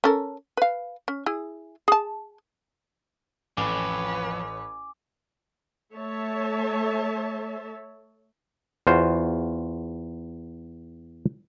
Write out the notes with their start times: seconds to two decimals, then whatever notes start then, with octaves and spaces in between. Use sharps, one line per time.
0.04 C#4 A4 A#4
0.57 B4 F5
1.08 C#4
1.26 E4 G#4
1.88 G#4 A5
3.57 A1 F2 B4 C#5 G#5 D6
5.95 A3 C#5 E5 A5
8.87 E2 F4 F#4 C5 F5